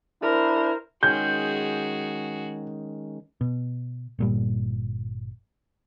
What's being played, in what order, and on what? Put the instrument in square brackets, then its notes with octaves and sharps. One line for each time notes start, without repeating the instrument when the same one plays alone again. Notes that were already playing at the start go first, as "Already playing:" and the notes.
[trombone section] D4 E4 [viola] A#4 C5
[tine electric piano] D#3 G#3 C#4 [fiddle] F#4 G#4 [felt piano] G6
[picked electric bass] B2
G1 A#2 G3